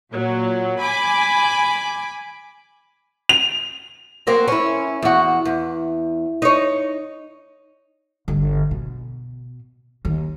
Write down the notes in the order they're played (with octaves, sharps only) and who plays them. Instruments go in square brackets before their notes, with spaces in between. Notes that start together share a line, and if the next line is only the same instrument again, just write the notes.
[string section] A#2 F#3
G#5 B5 D6
[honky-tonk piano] F7
[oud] F#3 A#3 C4
C#4 E4
E2 F#4
E2
D#4 C#5
[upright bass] G1
B2
D#2 D#3